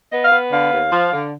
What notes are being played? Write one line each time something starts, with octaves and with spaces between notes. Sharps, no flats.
B3 D#5
F5
B3
D3 F5
D#2
F3
D3